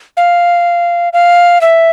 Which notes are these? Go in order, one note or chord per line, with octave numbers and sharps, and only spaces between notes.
F5
F5
E5